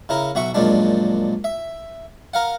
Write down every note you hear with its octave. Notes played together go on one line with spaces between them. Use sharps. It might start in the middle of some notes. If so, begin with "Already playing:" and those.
C#3 E4 A#4
B1 F#4 E5 C#6
F#2 A#2 F3 G#3 D4
E5
A#4 F5 F#5